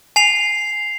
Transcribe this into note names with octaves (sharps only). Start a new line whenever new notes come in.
G#5 C7 F7